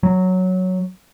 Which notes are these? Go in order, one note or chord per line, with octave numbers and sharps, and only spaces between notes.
F#3